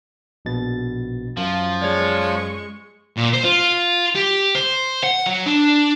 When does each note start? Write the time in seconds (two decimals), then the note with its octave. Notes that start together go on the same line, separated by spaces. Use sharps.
0.45 A#1 B2 A6
1.37 F#2 F3
1.82 G#3 C#5 D5 C#6
3.17 A#2
3.33 C5
3.44 F4
4.15 G4
4.55 C5
5.03 F#5
5.26 F#3
5.46 D4